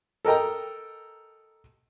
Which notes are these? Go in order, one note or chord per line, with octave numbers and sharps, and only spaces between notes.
A4 A#4 D#5 G5 A#5